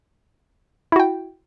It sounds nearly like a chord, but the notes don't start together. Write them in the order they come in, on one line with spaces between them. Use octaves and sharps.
E4 F#4 G5